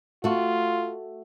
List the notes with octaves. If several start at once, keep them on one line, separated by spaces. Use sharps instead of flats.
A3 F4 F#4